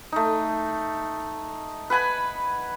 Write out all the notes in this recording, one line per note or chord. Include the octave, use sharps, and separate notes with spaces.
A3 D#4
B4 F#5 G#5 B5